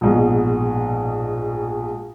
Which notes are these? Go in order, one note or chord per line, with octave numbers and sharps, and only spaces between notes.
A#1 G#2 B2